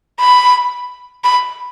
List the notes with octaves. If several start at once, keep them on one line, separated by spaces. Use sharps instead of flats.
B5
B5